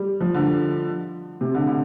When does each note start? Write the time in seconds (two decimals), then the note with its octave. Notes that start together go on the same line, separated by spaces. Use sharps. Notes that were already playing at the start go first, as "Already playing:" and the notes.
Already playing: G3
0.21 F3
0.34 D3
1.41 C3
1.54 D3
1.67 D3